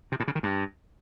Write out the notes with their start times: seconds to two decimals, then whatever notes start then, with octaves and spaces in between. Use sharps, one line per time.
0.12 C3
0.20 A2
0.28 C#3
0.35 D#3
0.43 G2